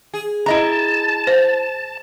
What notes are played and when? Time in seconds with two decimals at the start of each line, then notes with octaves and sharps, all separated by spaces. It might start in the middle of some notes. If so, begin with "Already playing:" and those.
0.14 G#4
0.46 E4 D#5 A5 A#5
1.27 C5